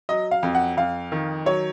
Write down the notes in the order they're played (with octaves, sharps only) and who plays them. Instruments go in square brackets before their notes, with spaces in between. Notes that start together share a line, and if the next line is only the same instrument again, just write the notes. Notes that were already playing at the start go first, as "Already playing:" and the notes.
[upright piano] F#3 D#5
F5
F2
F#5
F2 F5
D#3
F#3 C#5